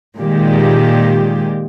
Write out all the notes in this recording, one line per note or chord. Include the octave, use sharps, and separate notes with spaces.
A#2 D#3 G#3 G4